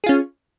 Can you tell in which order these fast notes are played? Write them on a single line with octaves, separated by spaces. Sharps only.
G#4 F4 C#4